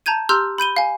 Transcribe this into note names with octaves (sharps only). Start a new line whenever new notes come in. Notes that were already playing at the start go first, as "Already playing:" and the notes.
A5 A#5 G6 G#6 D#7
G4 A#5 C6 E6 F6 G6
B5 G6 D#7 G7
F5 G#5